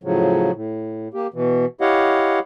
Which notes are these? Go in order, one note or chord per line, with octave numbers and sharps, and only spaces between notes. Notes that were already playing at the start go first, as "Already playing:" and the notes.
A2 C#3 F3 F#3
A2
A#3 G4
B2 E3
E4 G4 C#5 D#5 F5 F#5